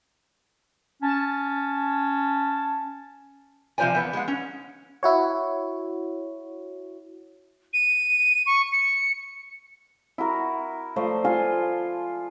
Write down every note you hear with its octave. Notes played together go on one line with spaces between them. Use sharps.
C#4 A5
C3 F3 F4 C5 D5 G#5
E2 B3
G#3 F#5
C#4
E4 F#4 C#5
D#7
C#6
C#7
E4 F#4 A#4
F3 A3 C5 D5
F4 G#5 A5 C6